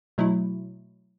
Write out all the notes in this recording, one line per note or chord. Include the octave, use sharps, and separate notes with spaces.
B2 F#3 A3 E4